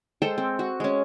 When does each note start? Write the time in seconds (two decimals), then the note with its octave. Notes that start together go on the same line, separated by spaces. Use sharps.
0.22 G#3 A4 C5 G5
0.38 C4
0.59 F#4
0.80 G#3 C#4